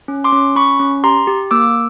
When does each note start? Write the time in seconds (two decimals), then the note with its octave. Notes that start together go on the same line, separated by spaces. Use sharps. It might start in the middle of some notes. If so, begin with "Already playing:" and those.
0.08 C#4
0.24 C6 D6
0.33 C#4
0.56 C#4 B5 C#6
0.80 C#4
1.04 G4 A#5 C6
1.27 G4
1.51 A#3 D6 E6